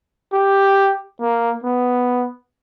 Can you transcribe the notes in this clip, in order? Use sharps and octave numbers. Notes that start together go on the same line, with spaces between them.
G4
A#3
B3